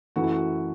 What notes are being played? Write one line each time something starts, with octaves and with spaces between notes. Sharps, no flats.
F#2 E3 A3 F#4
E4
F#4